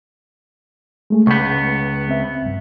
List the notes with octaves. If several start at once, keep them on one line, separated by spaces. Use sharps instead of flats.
G#3 A3 G#4
C#2 B3 C#6 G6
C4 E5
C2 G2